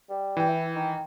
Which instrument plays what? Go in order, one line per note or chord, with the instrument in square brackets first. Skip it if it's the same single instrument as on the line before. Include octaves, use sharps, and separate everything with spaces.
[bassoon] G3
[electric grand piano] E3 G5
[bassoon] E4
D#3